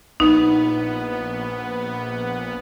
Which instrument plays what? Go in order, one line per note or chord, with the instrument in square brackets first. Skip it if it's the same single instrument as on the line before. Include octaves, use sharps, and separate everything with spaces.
[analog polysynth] A#1 B3 [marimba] D#4